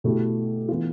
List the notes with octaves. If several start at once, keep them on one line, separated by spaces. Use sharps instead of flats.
B2 A3 E4 G4
E3 B3 F4